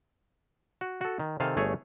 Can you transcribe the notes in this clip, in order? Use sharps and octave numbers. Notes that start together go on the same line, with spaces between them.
F#4
F#4 A4
D#3
C3 D#3 A4 F5 G#5
G1 A3 G#4 C#5